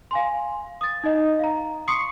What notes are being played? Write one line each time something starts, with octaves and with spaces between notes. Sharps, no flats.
F5 G#5 C6
D#6 A6
D#4 D#5
F5 A#5
C6 C#6 D#6 C7 C#7